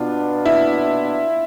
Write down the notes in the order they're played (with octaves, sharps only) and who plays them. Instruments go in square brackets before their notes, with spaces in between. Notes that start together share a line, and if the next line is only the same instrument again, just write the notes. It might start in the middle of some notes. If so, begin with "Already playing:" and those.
Already playing: [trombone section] B2 B3 D4 [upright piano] F4
[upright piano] E4